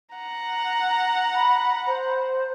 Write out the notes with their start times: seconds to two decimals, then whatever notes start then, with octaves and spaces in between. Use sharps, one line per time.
0.16 F#5 A#5
1.34 B5
1.87 C5